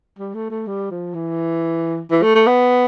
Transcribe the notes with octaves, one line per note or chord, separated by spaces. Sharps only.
G3
A3
A3
G3
F3
E3
E3
A3
A3
B3